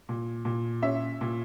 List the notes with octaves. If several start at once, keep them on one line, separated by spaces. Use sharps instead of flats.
A#2
A#2
C#4 E5
A#2